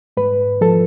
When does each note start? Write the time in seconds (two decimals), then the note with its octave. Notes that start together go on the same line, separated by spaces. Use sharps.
0.17 G#2 B4
0.61 F3 A4